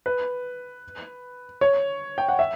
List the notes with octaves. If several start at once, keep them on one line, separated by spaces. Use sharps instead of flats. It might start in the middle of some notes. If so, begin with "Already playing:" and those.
B4
C#5
G5
F#5
E5